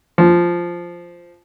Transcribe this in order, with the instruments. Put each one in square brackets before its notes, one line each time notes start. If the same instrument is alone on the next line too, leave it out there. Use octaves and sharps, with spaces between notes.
[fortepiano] F3